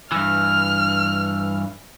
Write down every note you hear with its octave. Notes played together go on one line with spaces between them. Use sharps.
G2 E3 F6